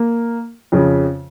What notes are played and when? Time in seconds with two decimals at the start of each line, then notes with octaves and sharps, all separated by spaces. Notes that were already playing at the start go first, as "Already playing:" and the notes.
Already playing: A#3
0.72 F2 C#3 F3